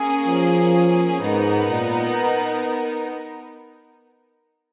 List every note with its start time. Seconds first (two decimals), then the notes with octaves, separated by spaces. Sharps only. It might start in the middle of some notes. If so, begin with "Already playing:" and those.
Already playing: A#3 C#4 G#4
0.27 F3
1.21 G#2 B3 D#4 A#4
1.69 A#2